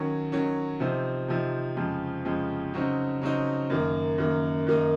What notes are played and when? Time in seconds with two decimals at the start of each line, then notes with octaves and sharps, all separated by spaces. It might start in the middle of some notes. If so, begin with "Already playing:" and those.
Already playing: D#3 F#3 C#4
0.32 D#3 F#3 C#4
0.80 C3 F3 C4 D#4
1.28 C3 F3 C4 D#4
1.77 F2 C#3 F3 G#3
2.25 F2 C#3 F3 G#3
2.73 C#3 F#3 C4 D#4
3.22 C#3 F#3 C4 D#4
3.70 F#2 D#3 A#3
4.18 F#2 D#3 A#3
4.66 F#2 D#3 A#3 D#4